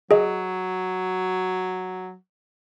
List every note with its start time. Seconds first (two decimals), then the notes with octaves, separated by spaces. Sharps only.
0.11 F#3 G#4 D#5